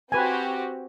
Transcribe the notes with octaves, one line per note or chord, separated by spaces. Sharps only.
C4 F#4 G4 B4 G#5